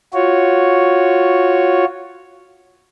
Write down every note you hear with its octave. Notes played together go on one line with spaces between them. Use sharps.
F4 F#4 C#5